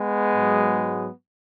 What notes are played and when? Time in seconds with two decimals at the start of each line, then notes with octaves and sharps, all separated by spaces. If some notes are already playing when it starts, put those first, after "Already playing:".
Already playing: G#3 B3
0.33 G#2 F#3